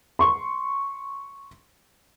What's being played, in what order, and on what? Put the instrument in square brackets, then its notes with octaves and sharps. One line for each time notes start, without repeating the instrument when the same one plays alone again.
[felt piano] C6 C#6